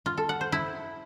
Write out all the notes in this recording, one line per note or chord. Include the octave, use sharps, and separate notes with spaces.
F4
A4
F#5
C5
E4